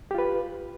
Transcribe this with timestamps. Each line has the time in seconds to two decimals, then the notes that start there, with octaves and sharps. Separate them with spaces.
0.11 G4
0.15 F4
0.18 B4